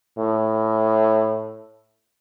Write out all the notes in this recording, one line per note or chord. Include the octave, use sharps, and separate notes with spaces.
A2